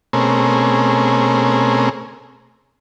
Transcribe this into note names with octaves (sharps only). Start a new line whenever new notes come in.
B2 A3 C4 C#4 G#4 A#4